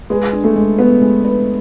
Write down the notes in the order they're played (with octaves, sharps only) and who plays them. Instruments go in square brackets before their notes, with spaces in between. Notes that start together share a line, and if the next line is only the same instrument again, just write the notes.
[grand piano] G#3 [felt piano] B4
[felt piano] D4
[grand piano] A3
[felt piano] G#3
[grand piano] B3 [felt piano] B4
[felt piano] G#3
B4